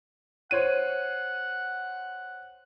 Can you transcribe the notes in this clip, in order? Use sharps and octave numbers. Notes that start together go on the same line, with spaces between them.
C5 C#5 F#5 D#7